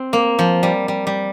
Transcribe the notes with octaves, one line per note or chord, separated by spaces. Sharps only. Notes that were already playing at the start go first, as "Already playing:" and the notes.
Already playing: C4
A#3
F3
G3
G3
G3